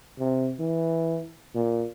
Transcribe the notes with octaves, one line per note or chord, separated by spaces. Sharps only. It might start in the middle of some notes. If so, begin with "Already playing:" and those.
C3
E3
A#2